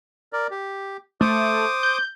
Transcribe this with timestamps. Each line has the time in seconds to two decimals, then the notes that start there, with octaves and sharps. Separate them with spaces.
0.33 A#4 D5
0.51 G4
1.21 A3 C5 D6 D#6
1.83 G6